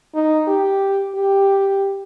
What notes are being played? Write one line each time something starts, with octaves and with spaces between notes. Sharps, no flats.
D#4
G4
G4